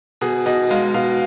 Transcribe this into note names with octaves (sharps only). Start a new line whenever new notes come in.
B2 G#4
B2 D#5
G#3 F5
B2 F5